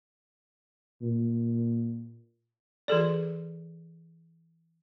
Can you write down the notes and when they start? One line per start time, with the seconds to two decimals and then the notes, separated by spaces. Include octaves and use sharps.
1.02 A#2
2.88 E3 G#4 A4 D5